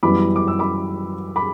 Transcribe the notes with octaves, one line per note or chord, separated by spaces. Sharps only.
F#2 E3 G3 B3 B5 D6
D6
E6
B5 D6
B5 D6